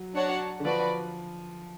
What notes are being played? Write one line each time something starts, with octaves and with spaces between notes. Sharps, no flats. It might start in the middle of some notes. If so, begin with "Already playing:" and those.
Already playing: F#3
D4 F#4 C#5 F#5 A5
D3
F3 F#4 B4 D5